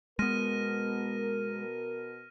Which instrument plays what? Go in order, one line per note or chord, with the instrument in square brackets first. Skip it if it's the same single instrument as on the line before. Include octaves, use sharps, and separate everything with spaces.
[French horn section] B2 A#4 [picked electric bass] G#3 B3 [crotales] F6 A#6 D#7